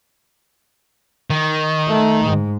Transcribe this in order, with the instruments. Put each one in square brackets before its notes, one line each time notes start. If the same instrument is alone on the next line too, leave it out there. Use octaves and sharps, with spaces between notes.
[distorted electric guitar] D#3
[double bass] A3
G#2